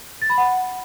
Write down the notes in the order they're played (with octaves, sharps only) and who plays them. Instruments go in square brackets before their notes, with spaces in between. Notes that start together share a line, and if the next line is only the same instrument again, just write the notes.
[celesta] A6
B5
F#5